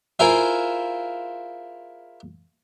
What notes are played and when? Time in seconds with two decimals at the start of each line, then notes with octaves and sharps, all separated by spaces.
0.19 E4 F4 G#4 A#4 C5 E5